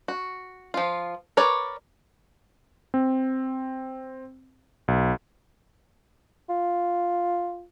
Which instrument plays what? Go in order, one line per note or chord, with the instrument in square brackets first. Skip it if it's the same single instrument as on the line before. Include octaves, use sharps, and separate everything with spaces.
[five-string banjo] F#4
F3 F4
A#4 B4 C#5 D5
[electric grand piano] C4
B1
[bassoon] F4